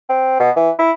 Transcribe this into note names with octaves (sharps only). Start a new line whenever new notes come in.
C4
B2
E3
E4